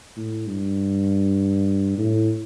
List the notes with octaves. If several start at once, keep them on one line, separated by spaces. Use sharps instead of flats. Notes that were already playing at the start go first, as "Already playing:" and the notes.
A2
G2
A2